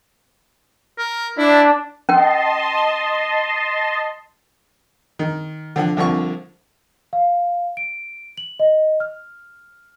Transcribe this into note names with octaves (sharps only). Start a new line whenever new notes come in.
A#4
D4 E4
C#4 A#4 D#5 G5 A5 C6
D#3
D3 F3 F#5
C2 D3 F3 C#6
F5
D7
F#7
D#5
F6